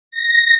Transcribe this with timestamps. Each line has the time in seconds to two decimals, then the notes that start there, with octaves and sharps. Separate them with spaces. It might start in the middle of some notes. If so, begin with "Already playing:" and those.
0.11 A#6